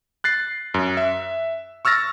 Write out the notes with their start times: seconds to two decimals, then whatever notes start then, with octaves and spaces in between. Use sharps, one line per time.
0.24 F#6 A6 C7
0.74 F#2
0.97 E5
1.85 C#6 E6 F6 A6 A#6